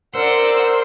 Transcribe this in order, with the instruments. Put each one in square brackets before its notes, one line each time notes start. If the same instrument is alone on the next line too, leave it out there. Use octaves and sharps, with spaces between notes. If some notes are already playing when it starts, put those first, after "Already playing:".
[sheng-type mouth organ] A#4 [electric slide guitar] C5 [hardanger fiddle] D5 F#5 [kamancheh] E6